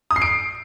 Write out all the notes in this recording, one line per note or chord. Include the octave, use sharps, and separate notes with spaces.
D#6
C7
D7